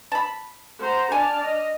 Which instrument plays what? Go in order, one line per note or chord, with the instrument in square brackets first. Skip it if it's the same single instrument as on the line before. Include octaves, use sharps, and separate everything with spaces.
[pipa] A5 B5
[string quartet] C5 F#5 A#5
[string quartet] D4 A5 F6 [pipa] G#5
[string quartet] D#5